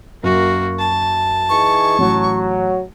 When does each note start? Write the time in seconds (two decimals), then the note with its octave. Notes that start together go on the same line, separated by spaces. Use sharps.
0.23 F#2 A#3 F#4
0.79 A5
1.49 E3 D#4 G#4 C#6
1.99 A1 F#3